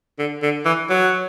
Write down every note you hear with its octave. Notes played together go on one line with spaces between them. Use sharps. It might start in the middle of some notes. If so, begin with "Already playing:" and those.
D3
D3
E3
F#3